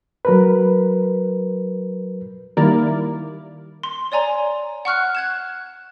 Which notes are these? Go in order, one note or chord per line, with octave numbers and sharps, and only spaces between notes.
F#3 A#4 B4
D#3 G3 A#3 E4 A#4 D5
C6
C#5 D5 G#5 A#5
F#5 C#6 F6 F#6
F#6 G#6 E7